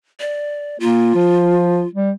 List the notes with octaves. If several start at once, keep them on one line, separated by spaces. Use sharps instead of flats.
D5
A#3 F4
F3
G3